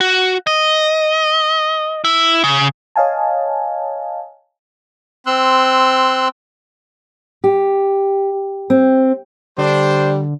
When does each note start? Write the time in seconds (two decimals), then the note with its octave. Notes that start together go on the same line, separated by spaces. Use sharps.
0.01 F#4
0.47 D#5
2.05 E4
2.44 C#3
2.96 C#5 D#5 F5 G#5 A5
5.26 C4 C6 E6 F#6
7.44 G4
8.70 C4
9.58 D3 G3 D4 C5